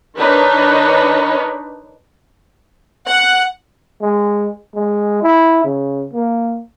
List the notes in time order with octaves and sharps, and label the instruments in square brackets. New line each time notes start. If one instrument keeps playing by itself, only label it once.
[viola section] D#3 D4 D#4 B4 C#5
[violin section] F#5
[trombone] G#3
G#3
E4
C#3
A#3